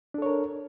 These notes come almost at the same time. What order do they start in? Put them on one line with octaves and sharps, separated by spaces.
D4 A4 C#5 A#4